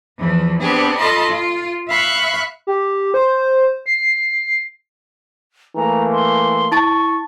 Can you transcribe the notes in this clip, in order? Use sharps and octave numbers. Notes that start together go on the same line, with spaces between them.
E2 E3 F3
B3 C4 D4 G4 G#4
F4 A4 D#5 A5 B5 C6
F4
E5 F5 B5 C#6 F#6
G4
C5
C7
E3 A3 A#3 A#5
C6
E4 A5 C#6 A6